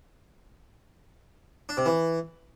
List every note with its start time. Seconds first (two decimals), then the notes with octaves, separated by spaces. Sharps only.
1.69 D4
1.77 C3
1.86 E3